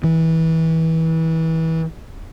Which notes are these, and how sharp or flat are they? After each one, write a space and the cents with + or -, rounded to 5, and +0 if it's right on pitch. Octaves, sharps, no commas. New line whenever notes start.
E3 -25